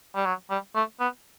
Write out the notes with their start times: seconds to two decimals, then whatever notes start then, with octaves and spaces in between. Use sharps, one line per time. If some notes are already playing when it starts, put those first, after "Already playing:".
0.15 G3
0.25 F#3
0.50 G3
0.75 A3
1.00 B3